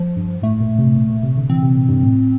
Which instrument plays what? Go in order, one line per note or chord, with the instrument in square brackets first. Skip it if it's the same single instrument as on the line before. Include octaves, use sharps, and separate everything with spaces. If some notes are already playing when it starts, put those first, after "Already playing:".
Already playing: [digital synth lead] F3
[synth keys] G2
[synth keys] A2 [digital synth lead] A3
[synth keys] A#2
C3
A#2
A#2
C3
D3
[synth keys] E3 [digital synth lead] C4
[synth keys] C3
A#2
G2
A2